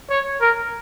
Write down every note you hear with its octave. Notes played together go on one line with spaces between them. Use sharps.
C#5
A#4